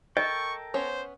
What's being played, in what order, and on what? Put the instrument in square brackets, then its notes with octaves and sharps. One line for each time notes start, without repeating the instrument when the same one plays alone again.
[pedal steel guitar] A4 A#4 G5 [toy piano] D#5 [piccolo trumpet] C#6
[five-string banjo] B3 C#4 C#5 [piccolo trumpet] C5